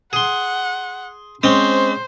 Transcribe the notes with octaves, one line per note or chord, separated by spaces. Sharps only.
G#4 F#5 C6
G#3 C4 C#4 C5